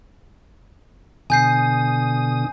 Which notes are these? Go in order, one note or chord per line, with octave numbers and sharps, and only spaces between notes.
B2 D3 G#5 D#6 G6 C7